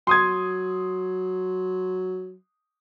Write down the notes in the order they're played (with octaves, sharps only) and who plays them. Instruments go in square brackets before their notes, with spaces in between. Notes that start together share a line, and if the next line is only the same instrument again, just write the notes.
[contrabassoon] F#3 [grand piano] C6 D#6 G#6